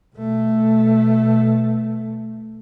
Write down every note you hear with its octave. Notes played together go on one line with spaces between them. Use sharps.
B2 A3